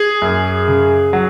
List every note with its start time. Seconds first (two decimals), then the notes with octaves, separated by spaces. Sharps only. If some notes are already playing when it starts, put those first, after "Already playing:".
Already playing: G#4
0.22 F#2
0.68 C#3
1.13 F#3